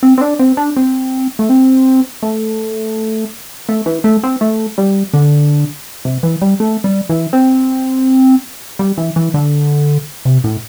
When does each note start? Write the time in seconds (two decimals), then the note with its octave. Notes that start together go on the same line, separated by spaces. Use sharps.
0.03 C4
0.18 C4
0.21 D4
0.39 C4
0.57 D4
0.77 C4
1.39 A3
1.49 C4
2.23 A3
3.69 A3
3.86 E3
4.04 A3
4.23 C4
4.41 A3
4.78 G3
5.14 D3
6.05 C3
6.23 E3
6.42 G3
6.60 A3
6.84 G3
7.09 E3
7.33 C4
8.79 G3
8.98 E3
9.16 E3
9.34 D3
10.25 C3
10.44 A2